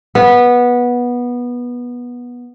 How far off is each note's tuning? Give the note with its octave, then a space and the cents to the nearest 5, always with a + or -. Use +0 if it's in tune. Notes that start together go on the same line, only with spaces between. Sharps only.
B3 -15